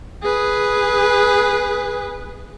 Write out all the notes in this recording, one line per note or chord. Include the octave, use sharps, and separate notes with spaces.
G#4 B4